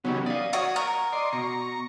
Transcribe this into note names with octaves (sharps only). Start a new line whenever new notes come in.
C#3 F#3 B3 D#4 G4
D5 F5 D#6
F#4 C#5
A#4 A#5
D5 D#5 C6
B2 A#5 C#6